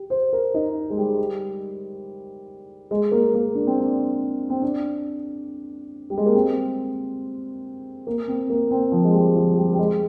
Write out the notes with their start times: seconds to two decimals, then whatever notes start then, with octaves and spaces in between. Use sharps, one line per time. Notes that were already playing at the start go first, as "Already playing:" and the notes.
Already playing: G4
0.10 C5
0.33 A#4
0.54 D#4
0.90 G#3
0.97 G3
2.91 G#3
3.11 A#3
3.34 A#3
3.55 D4
3.67 C4
3.80 D4
4.50 C4
4.62 D4
6.10 G3
6.18 G#3
6.26 A#3
6.35 C4
8.07 A#3
8.28 C4
8.50 A#3
8.71 C4
8.92 F3
9.04 G#3
9.14 G3
9.36 F3
9.57 G3
9.73 G3
9.79 G#3